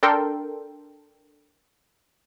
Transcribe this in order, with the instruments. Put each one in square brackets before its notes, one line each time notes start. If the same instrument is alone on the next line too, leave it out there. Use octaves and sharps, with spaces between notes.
[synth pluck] D4 A4 A#4 G5 C6